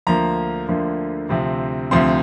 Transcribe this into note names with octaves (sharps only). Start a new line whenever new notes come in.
D2 D3 F3 A#3 A#5
D2 D3 F3 A#3
D2 C3 F3 C4
D2 C3 F3 C4 C6